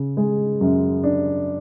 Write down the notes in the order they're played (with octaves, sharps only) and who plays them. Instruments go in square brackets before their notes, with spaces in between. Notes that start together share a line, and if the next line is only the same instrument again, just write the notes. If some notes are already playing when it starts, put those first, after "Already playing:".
Already playing: [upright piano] C#3
G#3
F#2
D4